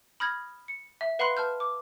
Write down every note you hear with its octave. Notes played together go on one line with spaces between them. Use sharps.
B5 D#6 F6 G6 G#6 A#6
C#7
E5
B4 F5 F#5 B5 C6 F#6
B4 A5 F6 G6
D6